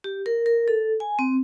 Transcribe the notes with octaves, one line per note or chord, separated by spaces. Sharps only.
G4
A#4
A#4
A4
G#5
C4